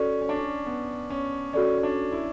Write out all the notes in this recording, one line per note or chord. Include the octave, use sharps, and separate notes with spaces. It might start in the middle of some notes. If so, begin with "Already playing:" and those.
Already playing: C#4 F#4 A4 D5
C#4
D4
C#4
B3
C#4
C#4 F#4 A4 D5
C#4
D4
E4